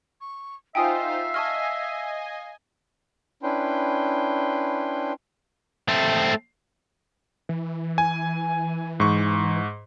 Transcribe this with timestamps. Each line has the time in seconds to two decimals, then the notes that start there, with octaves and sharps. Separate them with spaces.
0.21 C#6
0.75 D#4 F4 C5 E5 F5 G5 G#5 D#6
1.34 D#5 G#5 A5 C#6 F6
3.43 C#4 D4 E4 B4 G5 C6
5.88 A3 C4
7.49 E3
7.98 G#5
9.00 G#2 C#6